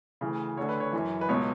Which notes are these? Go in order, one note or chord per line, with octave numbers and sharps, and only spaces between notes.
D2 C#3 E3
D2 D3 C#5
B4
C#5
F#2 E3
B4
C#2 B2 C#5